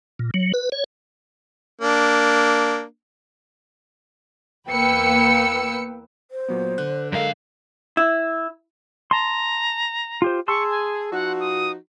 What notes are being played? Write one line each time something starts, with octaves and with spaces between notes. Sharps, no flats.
A#2
F#3
B4
C#5
A#3 D4
E2 A#3 B4 G5 E6 C#7
C5
A#2 F#3 B3
D3 F#6
F#2 G#3 A4 A#4 D#5 F5
E4
A5 A#5 C6
F4 G4 C5
G#4 A5 C6 C#6 E6
G#5
F3 D#4 F#4 F#5
D#6